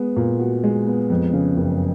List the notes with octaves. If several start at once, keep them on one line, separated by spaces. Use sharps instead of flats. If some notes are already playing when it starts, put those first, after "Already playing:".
Already playing: G#3 B3
A#2
F#4
G#3
B3
F2
C#3
F#1